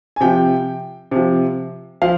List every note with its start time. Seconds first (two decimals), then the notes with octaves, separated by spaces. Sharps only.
0.16 G#5
0.21 C3 F3 G5
1.11 C3 F3
2.02 F3 F5